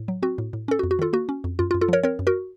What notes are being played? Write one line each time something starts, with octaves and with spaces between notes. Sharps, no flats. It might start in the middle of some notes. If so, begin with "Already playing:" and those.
Already playing: A2
F#3
C4 F#4
A2
A2
C#4 A4
F#4
F2
F#4
D#3 F4 A4
A#3 F#4
C#4
F2
F#2 F4
F4
F#2
F4 A4
F3 A#4 C#5
C4 A#4 C#5
F#2
F#4 A#4